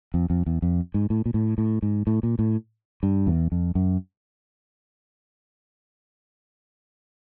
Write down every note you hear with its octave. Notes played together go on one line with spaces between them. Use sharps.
F2
F2
E2
F2
G#2
A2
A#2
A2
A2
G#2
A2
A#2
A2
G2
E2
F2
F#2